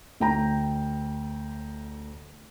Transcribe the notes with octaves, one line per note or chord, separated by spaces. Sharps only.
D2 G5 A#5